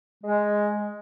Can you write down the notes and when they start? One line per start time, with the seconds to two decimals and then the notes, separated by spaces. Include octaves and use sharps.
0.24 G#3